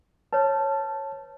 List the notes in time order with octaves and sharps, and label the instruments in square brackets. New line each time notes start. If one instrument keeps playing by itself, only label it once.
[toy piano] B4 C#5 [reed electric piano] A5